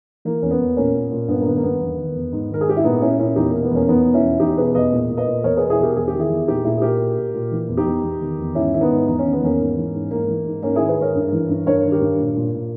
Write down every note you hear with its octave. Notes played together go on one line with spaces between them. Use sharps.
E3 A#3
E2 C#4
B3
E2
A#2 A#3 C#4
A#2
A#2
G2 B3
A#3
D#3 B3
A#3
G2 B3
E2
D#3
E2
G#2
D#3 A#4
G#4
G#2 G4
E4
A#2 B3 D#4
A#2 C#4 E4
A#2 C#4 E4
E2 D#4 G4
B2 A#3
B3
E2 A#3 C#4
E2 B3 D#4
B2
C#4 E4
E2
E2 D#4 G4
B2 G#4 B4
E2 B4 D#5
A#2
A#2
B4 D#5
A#2
E2 A#4 C#5
B2 G#4 B4
E4 G#4
E2 G4 A#4
E2 G#4
G4
D#3
E4 G#4
E2
A#2 D#4 G4
A#2 E4 G#4
G#4
A#2 G4 A#4
A#2
A#2
A#2
E3
E2
D#4 G4
E2
E2
D#3
E2
G#2 C#4 E4
D#3 E4
B3 D#4
G#2
E2 D#4
C#4
D#3
B3
E2 A#3 C#4
G#2
E3
G#2
G#2 A#3
E3
G#2
G#2 A#3 C#4
D#3 E4 G#4
G#4 B4
G#2 A#4 C#5
G2
E3
G2
G2 A#4 C#5
D#3
G4 A#4
G2
A#2
A#2
A#2